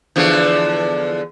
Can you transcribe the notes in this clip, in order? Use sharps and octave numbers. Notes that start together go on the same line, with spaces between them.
E2 D3 F3